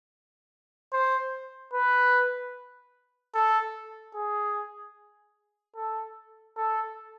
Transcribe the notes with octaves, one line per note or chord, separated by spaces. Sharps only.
C5
B4
A4
G#4
A4
A4